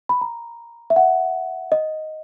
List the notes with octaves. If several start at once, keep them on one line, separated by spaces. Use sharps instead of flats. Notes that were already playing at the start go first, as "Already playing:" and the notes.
B5
A#5
E5
F#5
D#5